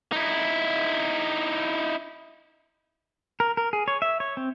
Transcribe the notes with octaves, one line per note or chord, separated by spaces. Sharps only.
D#4 E4
A#4
A#4
G#4
C#5
E5
C#5
C4